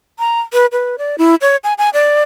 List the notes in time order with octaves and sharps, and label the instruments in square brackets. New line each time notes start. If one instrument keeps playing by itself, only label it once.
[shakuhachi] A#5
B4
B4
D5
E4
C#5
G#5
G#5
D5